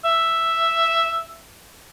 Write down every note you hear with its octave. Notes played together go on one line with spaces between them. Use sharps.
E5